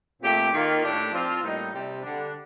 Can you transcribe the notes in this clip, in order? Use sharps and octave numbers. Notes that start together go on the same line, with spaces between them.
A#2 A3 C4 G4
D#3 A#3 F4
A2 A3 D4 G4
F3 C4 F4
A2 G3 A#3 D#4
C3 G3 C4
D3 G3 D4